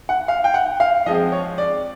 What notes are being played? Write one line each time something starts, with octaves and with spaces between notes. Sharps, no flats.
F#5
F5
G5
F#5
F5
F3 G#3 C4 D#5
C#5
D5